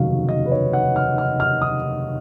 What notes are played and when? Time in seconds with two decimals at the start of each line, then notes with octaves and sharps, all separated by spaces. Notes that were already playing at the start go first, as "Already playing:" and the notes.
Already playing: F1 D#2 C#3 F#3 F5
0.29 D#5
0.46 B4
0.52 C#5
0.73 F#5
0.96 F6
1.18 F6
1.40 F6
1.62 D#6